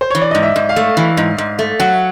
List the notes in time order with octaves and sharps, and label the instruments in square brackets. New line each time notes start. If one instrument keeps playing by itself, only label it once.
[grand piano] C5
[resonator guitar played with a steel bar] E3 [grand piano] C#5
[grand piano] D5
[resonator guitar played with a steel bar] G#2 [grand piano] D#5
[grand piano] E5
[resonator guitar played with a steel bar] G#2
[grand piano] F5
[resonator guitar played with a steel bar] A3
E3
G#2
G#2
A3
[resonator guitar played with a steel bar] F#3 [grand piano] F#5